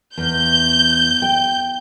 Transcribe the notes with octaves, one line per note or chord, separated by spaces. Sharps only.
E2 G6
G5